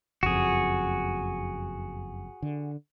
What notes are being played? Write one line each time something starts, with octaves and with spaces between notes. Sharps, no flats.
F#1 F2 F#4 G#4
D3